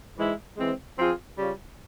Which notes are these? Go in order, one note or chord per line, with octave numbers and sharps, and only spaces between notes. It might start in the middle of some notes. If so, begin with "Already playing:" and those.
G#2 E3 G#3 E4
E3 G#3 C4
F3 C4 F4 G#4
C#3 G3 C#4 F4